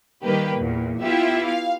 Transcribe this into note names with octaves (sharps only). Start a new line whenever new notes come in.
D#3 G3 A#3 G4 B4
E2 A#2
B3 E4 F4 G4 E5
F5